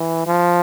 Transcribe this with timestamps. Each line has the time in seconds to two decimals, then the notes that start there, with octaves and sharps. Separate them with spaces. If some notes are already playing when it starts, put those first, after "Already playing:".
Already playing: E3
0.26 F3